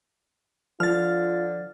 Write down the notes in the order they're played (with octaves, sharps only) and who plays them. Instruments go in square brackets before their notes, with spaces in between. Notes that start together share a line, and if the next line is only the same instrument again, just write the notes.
[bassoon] D3 [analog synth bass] F3 [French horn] F4 [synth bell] F6 A6